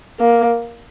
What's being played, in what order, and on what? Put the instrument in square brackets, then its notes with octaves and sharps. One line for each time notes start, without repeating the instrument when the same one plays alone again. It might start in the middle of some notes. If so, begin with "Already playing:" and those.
[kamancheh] A#3